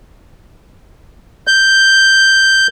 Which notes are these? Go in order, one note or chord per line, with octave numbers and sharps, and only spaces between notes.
G6